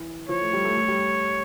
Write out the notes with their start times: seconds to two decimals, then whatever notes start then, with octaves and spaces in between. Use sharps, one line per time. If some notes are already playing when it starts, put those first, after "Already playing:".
Already playing: E3
0.29 F3 C#5
0.41 A3
0.53 G3
0.65 A3
0.77 A3
0.88 G3